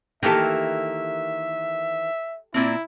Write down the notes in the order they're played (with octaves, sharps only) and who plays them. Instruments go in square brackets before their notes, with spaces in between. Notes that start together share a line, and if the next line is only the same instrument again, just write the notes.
[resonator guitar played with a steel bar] D#3 E3 A#3 [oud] G4 A4 [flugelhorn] E5
[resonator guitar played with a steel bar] A#2 A#3 C4 [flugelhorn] E4